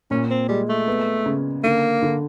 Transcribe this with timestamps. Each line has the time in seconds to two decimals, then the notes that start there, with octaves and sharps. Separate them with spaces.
0.11 A#2 C#4
0.30 C4
0.49 G3 G#3
0.69 A3
0.88 B3
1.26 C#3
1.64 D3 A#3
2.02 D3